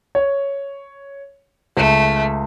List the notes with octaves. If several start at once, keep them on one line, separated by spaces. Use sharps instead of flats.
C#5
C#2 A3